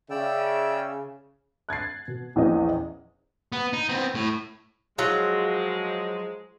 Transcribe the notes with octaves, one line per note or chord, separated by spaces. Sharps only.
C#3 D5 E5 G5 E6
F#6 G#6 A6 C7
B2
A#1 E2 E3 C#4 D#5
B3
D#4
B3 C4
A2
F3 F#3 G#3 F4